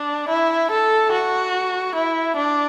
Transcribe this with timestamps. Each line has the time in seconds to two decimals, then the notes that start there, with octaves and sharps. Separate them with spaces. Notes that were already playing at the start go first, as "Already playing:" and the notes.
Already playing: D4
0.29 E4
0.71 A4
1.13 F#4
1.95 E4
2.36 D4